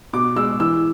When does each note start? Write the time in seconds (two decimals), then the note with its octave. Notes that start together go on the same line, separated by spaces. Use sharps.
0.13 B2 D6
0.36 G#3 E6
0.60 E3 E6